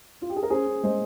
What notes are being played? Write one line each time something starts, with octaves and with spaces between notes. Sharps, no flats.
F4
G4
G#4
A#4
C#4 G#4 C5
C#4
G#3 C5 D#5